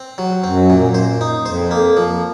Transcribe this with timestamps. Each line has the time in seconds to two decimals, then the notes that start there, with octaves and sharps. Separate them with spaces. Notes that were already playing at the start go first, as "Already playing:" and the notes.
Already playing: C4
0.18 F#3
0.44 F#2 C4
0.70 A#2
0.94 C5
1.21 D#4
1.46 F2 C5
1.71 A#3
1.97 F3